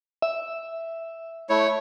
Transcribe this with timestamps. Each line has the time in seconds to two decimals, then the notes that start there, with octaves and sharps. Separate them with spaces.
0.22 E5
1.50 A3 E4 C#5